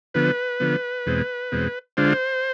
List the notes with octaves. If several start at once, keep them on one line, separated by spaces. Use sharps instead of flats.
D3 F3 B3 B4
D3 F3 B3
E2 B2 G#3 C4
E2 B2 G#3 C4
D3 G#3 D4 F4 C5